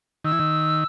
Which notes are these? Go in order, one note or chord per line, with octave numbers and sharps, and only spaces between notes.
D#3 E6
E3
D#3